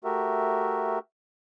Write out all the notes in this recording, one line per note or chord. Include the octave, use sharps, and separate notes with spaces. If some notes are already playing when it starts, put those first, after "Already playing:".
A3 F#4 G4 A#4 E5